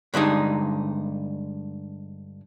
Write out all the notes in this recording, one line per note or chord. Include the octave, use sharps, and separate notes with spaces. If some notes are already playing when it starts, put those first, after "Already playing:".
G2 D3 G#3 D#4